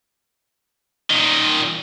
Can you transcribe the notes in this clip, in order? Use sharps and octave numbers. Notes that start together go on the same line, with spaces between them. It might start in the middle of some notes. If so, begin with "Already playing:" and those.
A#2 D#3